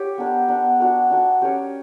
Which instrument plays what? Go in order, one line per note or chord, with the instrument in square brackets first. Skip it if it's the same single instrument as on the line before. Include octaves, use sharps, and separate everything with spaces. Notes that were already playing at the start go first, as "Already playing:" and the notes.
Already playing: [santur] G4 C#5
B3 D4 A#4
B3 D4 A#4
D4 F#4 A#4
D4 F#4 A#4
C#4 G4 A#4 C#5